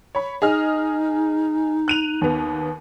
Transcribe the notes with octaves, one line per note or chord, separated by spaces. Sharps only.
C#5 B5
D#4 G#4 D#5 F6
F#6 D#7 F7
D#2 B3